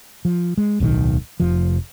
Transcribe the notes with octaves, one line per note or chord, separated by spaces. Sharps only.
F3
G#3
D1 B1 B2 D#3
F1 F3